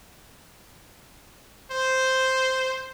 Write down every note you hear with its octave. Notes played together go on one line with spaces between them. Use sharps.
C5